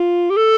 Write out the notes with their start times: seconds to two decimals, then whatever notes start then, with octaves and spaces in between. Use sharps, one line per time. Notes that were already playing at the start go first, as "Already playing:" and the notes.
Already playing: F4
0.30 G4
0.37 A4